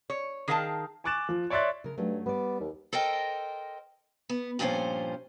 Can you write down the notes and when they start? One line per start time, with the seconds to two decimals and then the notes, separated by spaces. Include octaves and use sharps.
0.10 C#5
0.48 D#3 G#4 A#4 F5 G5 A5
1.04 G#5 C#6 D6 F#6 A6 E7
1.29 F3
1.50 C#5 D5 E5 C6 F#6 A6
1.84 C#3 A#4
1.98 G2 F#3 A3 C#4
2.26 G3 B3 D5
2.60 D#2
2.93 A4 A#4 C5 D#5 G5
4.29 B3
4.59 G2 A#2 F3 G3 C#4 C5